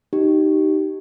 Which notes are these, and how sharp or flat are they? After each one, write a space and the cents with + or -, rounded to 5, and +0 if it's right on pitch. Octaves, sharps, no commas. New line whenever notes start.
D#4 +0 G4 -20